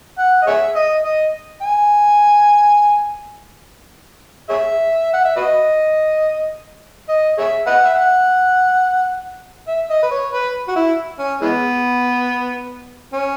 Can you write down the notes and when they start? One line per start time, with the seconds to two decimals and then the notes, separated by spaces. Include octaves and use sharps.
0.18 F#5
0.42 D#5
0.47 G#4 C#5 E5
0.76 D#5
1.05 D#5
1.62 G#5
4.49 G#4 C#5 E5
5.13 F#5
5.25 E5
5.37 F#4 B4 D#5
7.09 D#5
7.38 G#4 C#5 E5
7.67 B4 D#5 F#5
7.84 E5
7.95 F#5
9.68 E5
9.90 D#5
10.03 B4
10.11 C#5
10.32 B4
10.68 F#4
10.76 E4
11.19 C#4
11.41 E3 G#3 B3
13.13 C#4